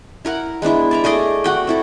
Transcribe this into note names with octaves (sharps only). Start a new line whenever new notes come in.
E4 A#4 F#5
G#3 B3 D4 E4
D5 E5 A#5
A3 G#4 D5 D#5
F#4 F#5 G5
C4 E4 A4